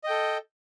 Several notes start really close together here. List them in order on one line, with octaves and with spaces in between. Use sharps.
D#5 G5 A4